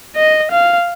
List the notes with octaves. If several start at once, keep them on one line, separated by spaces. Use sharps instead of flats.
D#5
F5